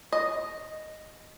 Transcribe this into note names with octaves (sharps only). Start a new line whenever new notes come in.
D#5